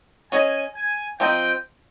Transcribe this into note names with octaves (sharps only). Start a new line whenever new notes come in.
C#4 G#4 D#5 G#5
G#5
F3 C4 D#4 G4 G5